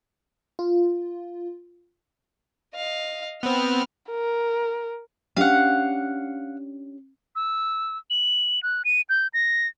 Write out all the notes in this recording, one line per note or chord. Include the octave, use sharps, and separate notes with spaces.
F4
D#5 F5
B3 C4 B5 F6
A#4
C#4 D4 G4 F5 F#5
E6
F#7
F#6
D#7
G6
A#6